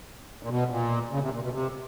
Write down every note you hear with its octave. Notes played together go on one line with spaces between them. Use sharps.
A#2
B2
A#2
C#3
C3
A#2
B2
C3